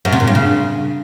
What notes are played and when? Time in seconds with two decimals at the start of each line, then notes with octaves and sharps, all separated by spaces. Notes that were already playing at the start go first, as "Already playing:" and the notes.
0.05 F#2
0.13 C3
0.20 A#2
0.28 G2
0.35 C#3